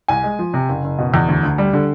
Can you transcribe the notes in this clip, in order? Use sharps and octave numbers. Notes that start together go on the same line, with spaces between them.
C2 G#5
G#3
F3
C3
F#1
F#1
B2
E2
D2
D2
G3
D3